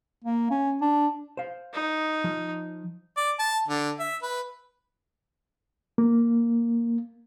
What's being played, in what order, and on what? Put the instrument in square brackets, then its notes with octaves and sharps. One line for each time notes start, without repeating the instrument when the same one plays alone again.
[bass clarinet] A#3
C#4
D4
[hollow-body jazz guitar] C5 F5
[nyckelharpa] D#4
[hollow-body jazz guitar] F3
[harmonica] D5
A5
D3
E5
B4
[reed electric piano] A#3